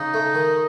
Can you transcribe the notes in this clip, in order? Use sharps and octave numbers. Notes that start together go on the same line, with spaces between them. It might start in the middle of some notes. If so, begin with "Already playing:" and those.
Already playing: C#3 D#4
A3
D#3